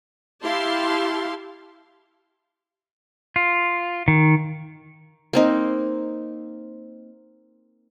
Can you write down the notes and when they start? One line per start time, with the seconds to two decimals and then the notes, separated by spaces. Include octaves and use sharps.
0.43 E4 G4 F5 A5 C6
3.36 F4
4.08 D#3
5.33 A#3 C4 D#4